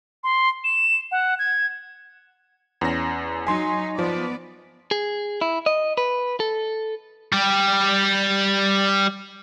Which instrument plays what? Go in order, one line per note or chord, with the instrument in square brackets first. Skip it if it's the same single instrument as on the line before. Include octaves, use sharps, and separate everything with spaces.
[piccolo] C6
E7
F#5
G#6
[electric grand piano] E2 C#4 A#6
[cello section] F#3 D#4 [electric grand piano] G#5 C6
[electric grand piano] F3 [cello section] B3 B4 D5
[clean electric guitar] G#4
E4
D#5
B4
A4
[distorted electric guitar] G3 G4